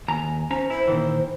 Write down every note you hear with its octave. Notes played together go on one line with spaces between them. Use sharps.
D#2 G#5 A#5
C#4 C5 A#5
E4 C5
A#2 D#3 E3